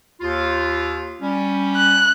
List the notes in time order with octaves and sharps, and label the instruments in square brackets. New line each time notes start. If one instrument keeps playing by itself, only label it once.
[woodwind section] D#2 F4
G3 C#4
[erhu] F#6